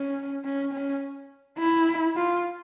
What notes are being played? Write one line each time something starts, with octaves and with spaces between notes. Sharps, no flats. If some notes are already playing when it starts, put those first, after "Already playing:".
Already playing: C#4
C#4
C#4
E4
F4